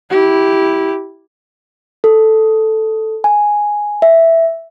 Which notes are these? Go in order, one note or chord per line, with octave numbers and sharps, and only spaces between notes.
E4 G4
A4
G#5
E5